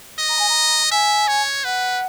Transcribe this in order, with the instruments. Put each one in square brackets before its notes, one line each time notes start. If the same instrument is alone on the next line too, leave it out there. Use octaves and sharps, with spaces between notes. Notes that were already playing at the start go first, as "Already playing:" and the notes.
[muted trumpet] D#5
[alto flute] A#5
G#5
A#5
[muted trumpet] E5 [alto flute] G#5
[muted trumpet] C#5
[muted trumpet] B4 [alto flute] F#5